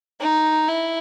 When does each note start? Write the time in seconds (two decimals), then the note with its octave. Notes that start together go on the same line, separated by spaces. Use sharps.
0.20 D#4
0.69 E4